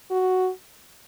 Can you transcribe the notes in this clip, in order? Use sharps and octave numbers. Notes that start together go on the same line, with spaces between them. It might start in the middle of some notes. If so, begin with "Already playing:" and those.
F#4